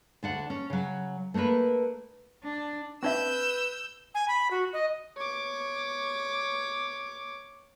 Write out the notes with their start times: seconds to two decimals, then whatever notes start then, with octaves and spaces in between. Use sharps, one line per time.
0.23 D2 D4 F#5
0.50 C#4
0.70 C#3 F#3
1.34 A3 A#3 D4 A#4 B4
2.43 D4
3.03 C4 D4 B4 E5 E6 G6
4.15 G#5
4.28 B5
4.51 F#4
4.73 D#5
5.17 C#5 D6